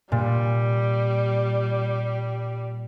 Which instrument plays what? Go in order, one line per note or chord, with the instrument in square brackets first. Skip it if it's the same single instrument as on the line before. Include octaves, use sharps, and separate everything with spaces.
[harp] A#2 [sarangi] G3